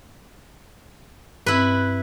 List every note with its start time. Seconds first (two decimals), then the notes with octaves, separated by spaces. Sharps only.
1.46 G2 C4 E4 B4